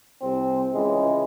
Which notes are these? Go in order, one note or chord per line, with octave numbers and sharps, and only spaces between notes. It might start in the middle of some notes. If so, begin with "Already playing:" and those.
C2 C4
C#2 C#3 E3 G#3